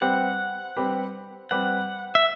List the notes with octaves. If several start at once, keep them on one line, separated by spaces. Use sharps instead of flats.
G3 C4 G4 B4 F#5
G3 C4 G4 B4
G3 C4 G4 B4 F#5
E5